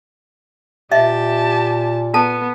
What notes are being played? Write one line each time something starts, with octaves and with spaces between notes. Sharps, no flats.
A#2 G4 D#5 E5 A5
B3 A4 A5